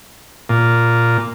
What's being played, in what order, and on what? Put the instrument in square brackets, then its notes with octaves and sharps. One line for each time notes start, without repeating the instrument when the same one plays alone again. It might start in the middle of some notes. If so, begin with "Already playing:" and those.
[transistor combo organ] A#2